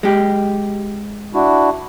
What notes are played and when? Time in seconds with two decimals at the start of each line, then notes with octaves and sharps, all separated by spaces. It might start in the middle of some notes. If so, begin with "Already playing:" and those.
0.03 G#3 G4
1.34 D4 E4 F#4